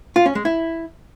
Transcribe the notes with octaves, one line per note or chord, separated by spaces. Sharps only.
F4
C#4
G#3
E4